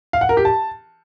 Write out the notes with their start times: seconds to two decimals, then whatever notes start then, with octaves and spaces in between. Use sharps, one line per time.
0.13 F5
0.21 F#5
0.29 A#4
0.37 G4
0.45 A5